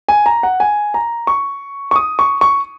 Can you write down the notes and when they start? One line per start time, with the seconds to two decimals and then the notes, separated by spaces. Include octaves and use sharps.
0.09 G#5
0.26 A#5
0.43 F#5
0.60 G#5
0.94 A#5
1.27 C#6
1.91 C#6
1.96 D#6
2.19 C#6
2.41 C#6